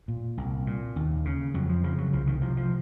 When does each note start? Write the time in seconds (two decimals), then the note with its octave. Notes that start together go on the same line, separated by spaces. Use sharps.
0.08 A#2
0.38 C2
0.67 A#2
0.96 D#2
1.25 C#3
1.54 F2 F#3
1.69 F3
1.84 C#3 F3
1.98 F#3
2.13 C2 F3
2.27 D#3
2.41 C3 F3
2.57 F3